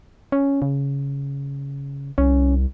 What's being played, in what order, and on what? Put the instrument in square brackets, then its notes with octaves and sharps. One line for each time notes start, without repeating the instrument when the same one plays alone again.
[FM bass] C#4
C#3
[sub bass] C2 [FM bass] C#4